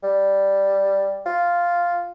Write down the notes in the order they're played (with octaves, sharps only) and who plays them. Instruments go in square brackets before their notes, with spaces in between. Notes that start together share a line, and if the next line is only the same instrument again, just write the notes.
[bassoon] G3
F4